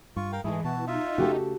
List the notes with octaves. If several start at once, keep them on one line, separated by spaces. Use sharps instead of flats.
G2 F4 C#6
A#4 F5 G5
G#2 E3 G#3 A3 G#4
B2 F#4 A5
D#4 F4 E5
C#3 G#3 A3 F#4 G4 A4